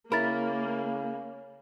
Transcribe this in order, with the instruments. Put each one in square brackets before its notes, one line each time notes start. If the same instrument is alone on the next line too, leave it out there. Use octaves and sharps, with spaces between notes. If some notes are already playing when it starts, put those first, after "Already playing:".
[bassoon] C#3 [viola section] A#3 [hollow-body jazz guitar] E4 A#4 [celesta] B5 A6